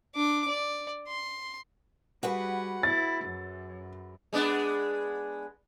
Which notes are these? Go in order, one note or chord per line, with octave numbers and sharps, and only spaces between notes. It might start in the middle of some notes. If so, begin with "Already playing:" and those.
D4 D6
D5
C6
G3 F#4 G#4 B4 F#5
E4 A6
F#2
G#3 B3 D4